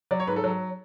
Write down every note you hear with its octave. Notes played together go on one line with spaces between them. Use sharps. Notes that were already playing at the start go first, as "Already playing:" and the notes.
F#3 D5
C#5
G#2 B4
A4
F#3